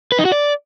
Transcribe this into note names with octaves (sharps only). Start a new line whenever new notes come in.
B4
D#4
F#4
D5